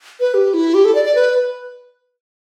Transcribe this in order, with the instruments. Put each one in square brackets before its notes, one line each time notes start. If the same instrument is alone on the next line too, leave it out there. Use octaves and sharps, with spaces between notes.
[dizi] B4
G4
E4
G4
A4
D5
D5
B4